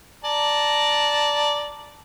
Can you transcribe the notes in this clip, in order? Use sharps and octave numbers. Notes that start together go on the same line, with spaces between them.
D5 A5 A#5